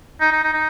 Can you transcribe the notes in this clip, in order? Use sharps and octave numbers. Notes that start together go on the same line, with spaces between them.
D#4
D#4
D#4
D#4